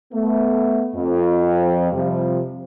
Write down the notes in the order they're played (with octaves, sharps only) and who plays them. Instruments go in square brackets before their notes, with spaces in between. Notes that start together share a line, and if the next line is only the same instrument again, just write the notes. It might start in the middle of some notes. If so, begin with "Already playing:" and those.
[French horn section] A3 B3
F2
C3 F3 G3